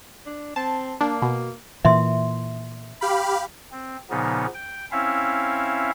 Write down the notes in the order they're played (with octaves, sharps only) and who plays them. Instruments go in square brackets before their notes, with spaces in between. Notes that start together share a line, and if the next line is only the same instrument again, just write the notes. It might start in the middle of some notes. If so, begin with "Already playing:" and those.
[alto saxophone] D4
[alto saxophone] C4 [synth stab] A5
[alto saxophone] A#3 [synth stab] D4
[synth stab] B2
[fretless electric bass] A#2 E3 [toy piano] E5 C6
[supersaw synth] G4 F5 B5
[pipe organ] C4
A#2 C#3 F3 B3 D#4
G5
C4 C#4 E4 E5 F5